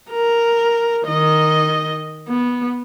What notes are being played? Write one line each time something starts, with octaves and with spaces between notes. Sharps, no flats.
A#4
D#3 D#5
B3